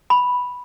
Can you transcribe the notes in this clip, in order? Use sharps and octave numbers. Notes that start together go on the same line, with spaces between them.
B5